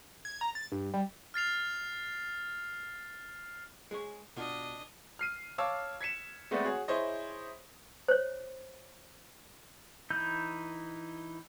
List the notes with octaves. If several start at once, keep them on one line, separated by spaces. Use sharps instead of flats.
G#6
A#5
A6
G2
G3
F6 A6 C7 F7
G#3 G#4 C#5
B2 D4 F4 D#5
F6 C7 D#7
C#5 F5 A5 D6 E6
G#6 B6 C#7 E7
G#3 A3 B3 C4 D5
F#4 G#4 C#5
E4 G#4 C5 C#5 D#5
C5 C#5
E3 D#4 E4 G6